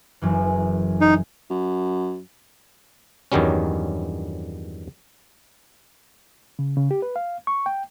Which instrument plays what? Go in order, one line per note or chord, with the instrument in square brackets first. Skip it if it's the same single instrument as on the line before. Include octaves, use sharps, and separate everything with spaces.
[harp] F#1 F#2 E3
[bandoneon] D#4
[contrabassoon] F#2
[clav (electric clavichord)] E2 G2 D#3 F#3 G3 C#4
[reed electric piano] C#3
C#3
G4
B4
F5
C#6
G5